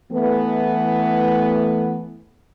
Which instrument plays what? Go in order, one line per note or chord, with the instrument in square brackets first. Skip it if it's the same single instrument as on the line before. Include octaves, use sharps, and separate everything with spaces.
[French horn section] E3 A3 B3